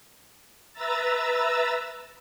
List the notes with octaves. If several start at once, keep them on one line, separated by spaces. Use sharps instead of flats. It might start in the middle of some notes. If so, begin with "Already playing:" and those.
B4 E5 A#5 E6 A6